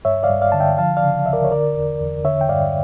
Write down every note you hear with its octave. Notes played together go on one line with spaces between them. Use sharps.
G2 C#5 E5
D5 F5
G2
D5 F5
D3 A5
E5 G5
F3 F5 A5
D5 F5
C#3
C#2 E5
A#4 D5
C#5
D3 A#4 D5
E2
E2
D3 C#5 E5
G5
G2 D5 F5